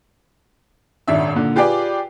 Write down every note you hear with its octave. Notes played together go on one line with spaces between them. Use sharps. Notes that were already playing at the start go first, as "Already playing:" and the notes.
D#1 G#1 D4 E5
A#2 D3
F4 G4 G#4 B4 D5 G5